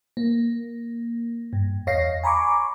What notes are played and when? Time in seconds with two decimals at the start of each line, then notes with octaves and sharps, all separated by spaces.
0.17 A#3
1.53 G2
1.87 E2 C#5 D#5 F5 A#6 C7
2.23 G#5 A#5 B5 C#6 D6